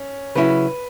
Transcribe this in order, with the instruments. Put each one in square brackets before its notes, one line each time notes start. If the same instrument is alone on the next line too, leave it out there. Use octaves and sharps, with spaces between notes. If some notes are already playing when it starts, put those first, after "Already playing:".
Already playing: [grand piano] C#4
[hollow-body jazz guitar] C#3 F#3 C#4 E4 [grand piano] B4